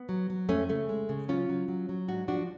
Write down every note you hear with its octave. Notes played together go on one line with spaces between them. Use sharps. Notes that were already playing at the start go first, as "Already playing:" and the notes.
Already playing: B3
F#3
F#3
F2 A3 C#4
C#3 A3
G#3
C#3
F#3 C#4 F4
F#3
F#3
F#3
G#2 D4 F#4
F3 D4 F#4